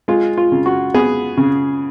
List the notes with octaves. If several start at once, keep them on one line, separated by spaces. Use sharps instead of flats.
G#3 F4
F4
C#3
F#4
B3 G#4
C#3